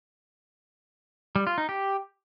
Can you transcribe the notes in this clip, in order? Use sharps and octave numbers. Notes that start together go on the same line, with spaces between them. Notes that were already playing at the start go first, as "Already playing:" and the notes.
G3
F4
D#4
G4